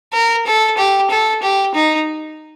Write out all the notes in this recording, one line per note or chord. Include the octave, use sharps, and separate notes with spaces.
A#4
A4
G4
A4
G4
D#4